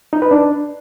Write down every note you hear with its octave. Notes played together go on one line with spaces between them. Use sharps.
D#4
B4
D4